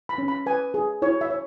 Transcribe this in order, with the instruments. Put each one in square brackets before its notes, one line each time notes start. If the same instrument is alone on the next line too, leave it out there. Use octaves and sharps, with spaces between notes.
[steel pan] B5
C#4
B5
B4 G#5
G#4
E4 C#5
E5
C#5